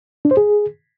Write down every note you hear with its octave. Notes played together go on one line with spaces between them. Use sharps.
D4
C5
G#4